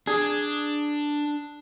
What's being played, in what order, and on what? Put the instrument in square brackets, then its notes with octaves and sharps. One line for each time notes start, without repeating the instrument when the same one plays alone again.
[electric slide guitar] D4 [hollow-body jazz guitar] G#4